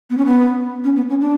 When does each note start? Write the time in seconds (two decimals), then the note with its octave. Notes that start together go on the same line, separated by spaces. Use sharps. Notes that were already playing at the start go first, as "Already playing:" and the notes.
0.10 B3
0.18 C#4
0.26 B3
0.84 C#4
0.96 B3
1.09 C#4
1.21 D4